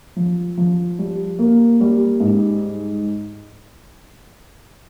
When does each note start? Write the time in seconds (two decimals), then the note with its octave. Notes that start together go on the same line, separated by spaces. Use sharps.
0.16 F3
0.58 F3
0.99 G3
1.39 A#3
1.81 G3
2.20 G#2